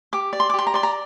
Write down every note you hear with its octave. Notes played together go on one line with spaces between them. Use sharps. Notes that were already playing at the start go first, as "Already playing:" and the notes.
G4 D6
D5
C6
D6
G4 C6
A#5
D5 C6
A#5